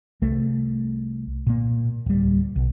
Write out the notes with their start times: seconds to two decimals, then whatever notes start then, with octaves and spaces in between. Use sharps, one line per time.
0.22 C2 A3
1.47 A#2 A#3
2.06 D1 G3
2.56 B1